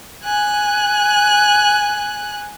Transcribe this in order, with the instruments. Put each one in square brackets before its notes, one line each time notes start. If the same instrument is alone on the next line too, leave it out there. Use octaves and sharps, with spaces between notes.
[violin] G#5 F#6